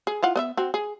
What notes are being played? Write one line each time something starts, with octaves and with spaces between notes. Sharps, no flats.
G#4
E4 F4 F#5
B3 D#5 E5
C4 F#4
G#4